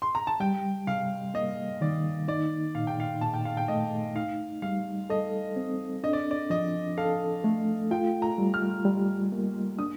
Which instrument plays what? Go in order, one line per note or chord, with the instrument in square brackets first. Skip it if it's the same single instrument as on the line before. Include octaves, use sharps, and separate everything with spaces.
[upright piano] C6
A#5
A5
[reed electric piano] G3 [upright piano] G5
[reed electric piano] C3 [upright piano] F5
[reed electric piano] A#3 [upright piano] D#5
[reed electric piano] D#3 [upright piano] D5
[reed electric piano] D#4 [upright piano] D5
[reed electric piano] A#2 [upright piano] F5
[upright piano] G5
F5
[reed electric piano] A#2 [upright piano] A5
[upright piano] G5
F5
G5
[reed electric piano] A3 [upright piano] D#5
[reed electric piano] D#4 [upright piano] F5
[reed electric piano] G3 [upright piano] F5
[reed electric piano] A4 [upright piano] D#5
[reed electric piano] C4
[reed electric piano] D4 [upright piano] D#5
[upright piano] D5
D5
[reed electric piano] F3 [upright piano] D#5
[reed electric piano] A4 [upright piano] F5
[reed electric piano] A3
[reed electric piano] F4 [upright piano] G5
[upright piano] A#5
[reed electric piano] G3
[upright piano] F6
[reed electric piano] G3
A#3
[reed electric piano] D4 [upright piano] D#6